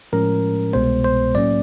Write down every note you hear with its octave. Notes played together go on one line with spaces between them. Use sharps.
A2 F3 G#3 C#4 A#4
C2 B2 G#3 B3 C5
C5
A2 F#3 A#3 C#4 D5